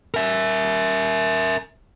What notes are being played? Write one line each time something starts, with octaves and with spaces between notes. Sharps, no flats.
A#4 E5